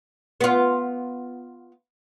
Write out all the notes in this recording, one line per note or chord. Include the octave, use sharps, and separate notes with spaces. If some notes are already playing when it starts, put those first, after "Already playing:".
B3 F4